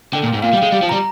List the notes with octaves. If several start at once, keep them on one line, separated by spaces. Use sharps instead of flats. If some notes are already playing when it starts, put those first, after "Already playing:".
D3 G5
A#2
G#2
A#2 F5
G3
G#3 G5
G3
F3
G3 A#5